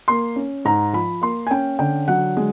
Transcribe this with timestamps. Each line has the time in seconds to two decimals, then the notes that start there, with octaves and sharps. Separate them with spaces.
0.08 A#3 C6
0.36 C#4
0.65 G#2 A#5
0.93 F3 B5
1.22 A#3 C6
1.47 G#5
1.51 C#4 G5
1.79 D3 G5
2.08 F#3 F#5
2.37 G#3